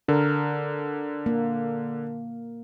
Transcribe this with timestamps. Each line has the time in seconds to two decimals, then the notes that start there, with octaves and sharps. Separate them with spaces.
0.08 D3 A#4
1.26 A#3